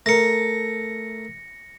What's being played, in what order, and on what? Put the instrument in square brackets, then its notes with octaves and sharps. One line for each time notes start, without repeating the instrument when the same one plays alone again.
[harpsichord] A3 A#4 [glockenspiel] A#6 C#7